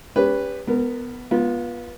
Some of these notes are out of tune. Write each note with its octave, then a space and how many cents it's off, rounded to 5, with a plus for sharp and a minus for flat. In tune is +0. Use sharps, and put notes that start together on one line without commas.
C#4 +30 G4 +25 B4 +0
B3 +5 A#4 -20
B3 -30 F4 +0